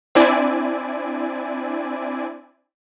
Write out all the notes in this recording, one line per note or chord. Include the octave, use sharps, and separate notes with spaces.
C4 D4 E4 D5 G#5